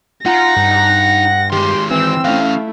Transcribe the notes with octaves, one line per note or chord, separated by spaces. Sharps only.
D#4 F4 F#5 A#5 A#6
G2
D#3 G#3 G4 C6
E3 C4 E6
E3 A3 C#4 E4 F5